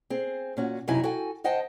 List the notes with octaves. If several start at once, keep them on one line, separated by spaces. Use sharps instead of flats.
C4 G#4
A#2 C#4 F#4
F#2 C3 F#3 D#4 E4 G#5
F#4 A4 G5 G#5
C5 D#5 F#5 G5 A5